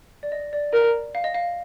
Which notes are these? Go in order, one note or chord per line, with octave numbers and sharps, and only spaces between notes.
D5
D#5
D5
A#4
F5
D#5
F5